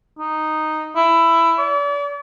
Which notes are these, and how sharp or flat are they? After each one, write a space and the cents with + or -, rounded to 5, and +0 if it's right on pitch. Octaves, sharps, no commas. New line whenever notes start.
D#4 -5
E4 +15
D5 -40